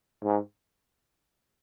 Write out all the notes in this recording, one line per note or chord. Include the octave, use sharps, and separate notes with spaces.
G#2